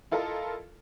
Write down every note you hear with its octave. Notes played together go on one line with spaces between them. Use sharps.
E4 F4 A4 A#4 D#5